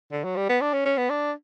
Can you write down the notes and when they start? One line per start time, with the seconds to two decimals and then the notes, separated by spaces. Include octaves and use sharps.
0.12 D3
0.24 F#3
0.36 G3
0.49 B3
0.61 D4
0.74 C#4
0.85 C#4
0.98 B3
1.10 D4